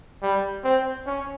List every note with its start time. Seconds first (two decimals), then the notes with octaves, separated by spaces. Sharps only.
0.22 G3
0.64 C4
1.07 C#4